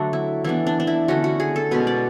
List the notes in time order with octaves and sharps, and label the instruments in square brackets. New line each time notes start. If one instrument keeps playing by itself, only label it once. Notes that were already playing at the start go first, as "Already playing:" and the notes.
Already playing: [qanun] D3 F#3 A3 D4 F#4
E4
E3 B3 D4 E4
D4
D4
E4
D3 A3 C#4 F#4
F#4
G#4
A4
B2 G#3 C#4 B4
D5